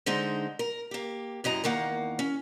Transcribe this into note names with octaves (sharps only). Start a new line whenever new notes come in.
D3 G#3 D#4 C5
A#4
A#3 G4
F#2 E3 D#5 A#5
E2 D#3 A#3 F#5
C#4